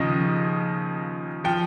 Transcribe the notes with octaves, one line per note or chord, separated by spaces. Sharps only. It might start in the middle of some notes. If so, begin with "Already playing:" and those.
Already playing: D#2 C#3 F3 D#5
F3 G5